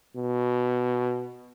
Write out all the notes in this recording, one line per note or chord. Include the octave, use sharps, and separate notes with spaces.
B2